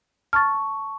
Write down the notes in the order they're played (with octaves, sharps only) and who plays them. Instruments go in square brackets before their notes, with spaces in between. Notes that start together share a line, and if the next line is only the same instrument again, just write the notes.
[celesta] A5 C#6 [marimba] F6 A6